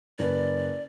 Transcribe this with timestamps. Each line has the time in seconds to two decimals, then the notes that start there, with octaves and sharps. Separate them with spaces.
0.19 F#1 B4 D5